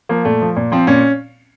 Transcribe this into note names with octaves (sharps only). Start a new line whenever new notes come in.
F3 A#3
A#2 A3
F3
A#2
F3 C4
A#2 C#4